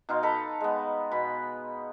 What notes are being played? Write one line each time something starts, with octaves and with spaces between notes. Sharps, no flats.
B2 D#4 F5 C6
A4 D#5 A#5 B5
G#3 B3
B2 B5